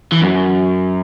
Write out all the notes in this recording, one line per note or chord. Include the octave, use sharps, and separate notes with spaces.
E3
F#2